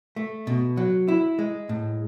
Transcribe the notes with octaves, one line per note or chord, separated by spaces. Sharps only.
A3
B2
F#3
E4
G#3
A2